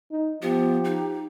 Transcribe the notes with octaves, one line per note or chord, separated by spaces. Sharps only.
D#4
F3 B3 G4
D#4